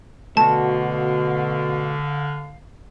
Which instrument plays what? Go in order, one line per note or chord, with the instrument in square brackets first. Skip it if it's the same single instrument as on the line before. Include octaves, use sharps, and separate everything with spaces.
[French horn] B2 [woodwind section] D3 F5 [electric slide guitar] A3 F#4 [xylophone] A5